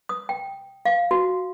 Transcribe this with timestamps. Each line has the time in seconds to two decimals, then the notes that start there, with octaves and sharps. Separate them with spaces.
0.09 D#6
0.29 G5
0.85 F5
1.11 F#4